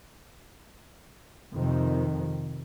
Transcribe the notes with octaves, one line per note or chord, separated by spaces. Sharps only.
F2 C3 D#3 F3